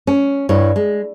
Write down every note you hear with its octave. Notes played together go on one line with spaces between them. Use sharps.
C#4
G2 E4 C#5
G#3